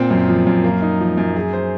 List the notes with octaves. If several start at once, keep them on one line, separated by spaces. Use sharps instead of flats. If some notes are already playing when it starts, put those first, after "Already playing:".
Already playing: A#2 C4
F#2
F3
F#2
A#3
D#4
F3
F#2
G#4
C5